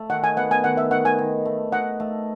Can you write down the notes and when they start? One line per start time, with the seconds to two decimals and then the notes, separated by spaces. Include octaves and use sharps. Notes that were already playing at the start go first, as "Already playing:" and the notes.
Already playing: A3
0.10 D#3 F#5
0.24 G#5
0.37 B3 F#5
0.51 G#5
0.64 D#3 F#5
0.77 E5
0.91 D#3 F#5
1.05 G#5
1.19 D#3
1.45 A3
1.72 D#4 F#5
2.00 A3